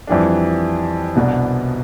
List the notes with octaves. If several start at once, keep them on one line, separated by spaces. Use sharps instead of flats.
F2 E3 G3 D4
C2 B2 B3 D4